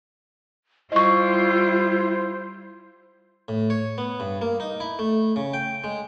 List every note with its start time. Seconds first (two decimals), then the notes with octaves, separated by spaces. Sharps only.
0.92 G3 E4 F4 C5 D#5 C#6
3.48 A2
3.70 C#5
3.98 B3
4.20 G2
4.41 A#3
4.60 D#4
4.80 E4
4.99 A3
5.36 C#3
5.54 G5
5.84 G#3